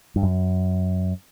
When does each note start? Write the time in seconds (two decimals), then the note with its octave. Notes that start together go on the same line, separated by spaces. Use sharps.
0.16 G2
0.23 F#2